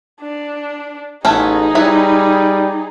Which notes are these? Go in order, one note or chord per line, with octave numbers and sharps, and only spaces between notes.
D4
A1 A3 B3 C#4 D#4 G#4
G3 E4 B4 C#5